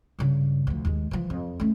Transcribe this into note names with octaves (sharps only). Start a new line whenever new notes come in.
G2 C#3
D2 F3
D#2 G#3
E3 F3
F2
A3 C#4